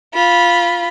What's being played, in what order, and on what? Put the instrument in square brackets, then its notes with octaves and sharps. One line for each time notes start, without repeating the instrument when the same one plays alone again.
[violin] F4 B5